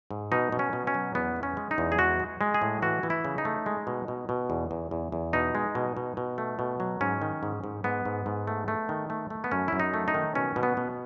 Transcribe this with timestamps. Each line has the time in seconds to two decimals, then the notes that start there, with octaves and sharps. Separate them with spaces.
0.11 G#2
0.32 B2 D#4
0.52 B2
0.59 C#4
0.73 B2
0.87 C#4
0.94 F#3
1.15 E2 B3
1.36 G#3
1.43 C#4
1.57 G#3
1.71 D#4
1.78 E2
1.92 G#4
1.99 G#3 F#4
2.20 G#3
2.41 G#3
2.54 G#4
2.62 A2
2.82 E3 F#4
3.03 E3
3.10 E4
3.25 C#3
3.38 D#4
3.45 A3
3.66 G#3
3.87 B2
4.08 B2
4.29 B2
4.50 E2
4.71 E2
4.91 E2
5.12 E2
5.33 B2 D#4
5.55 G#3
5.75 B2
5.97 B2
6.17 B2
6.38 A3
6.59 B2
6.80 F#3
7.01 G#2 C#4
7.22 D#3
7.43 G#2
7.64 G#2
7.84 G#2 B3
8.05 G#2
8.26 G#2
8.47 A3
8.68 A3
8.89 D#3
9.10 A3
9.30 A3
9.44 B3
9.52 F#2 C#4
9.68 F#2 E4
9.80 D#4
9.94 A3
10.08 D#4
10.14 D#3
10.35 B2 C#4
10.56 B2
10.63 B3
10.77 B2